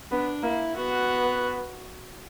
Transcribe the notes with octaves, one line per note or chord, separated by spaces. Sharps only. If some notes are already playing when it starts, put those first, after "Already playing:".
B3 D4
A#3 E4
B3 F#4